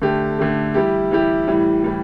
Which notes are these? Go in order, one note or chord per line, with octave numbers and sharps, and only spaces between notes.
D3 A3 G4
D3 A3 G4
E3 G3 E4 G4
E3 G3 E4 G4
A2 E3 G3
A2 E3 G3